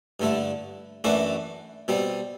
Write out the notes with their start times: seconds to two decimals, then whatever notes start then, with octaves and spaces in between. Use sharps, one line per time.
0.20 G2 D3 A3 E4
1.04 F#2 E3 A3 D4 F#4
1.88 B2 G3 C4